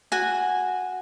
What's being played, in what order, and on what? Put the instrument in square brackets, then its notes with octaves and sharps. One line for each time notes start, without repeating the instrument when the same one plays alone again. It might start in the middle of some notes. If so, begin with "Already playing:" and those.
[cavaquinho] F#4 G#5